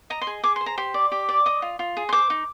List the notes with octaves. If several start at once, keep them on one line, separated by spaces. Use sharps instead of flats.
D#5 A#5
C6
G#4
G#4 D6
C6
C5
A#5
G4 C6
D5
G4
D5
D#5 D#6
F4
F4
G#4
C6
C5 D6
D#4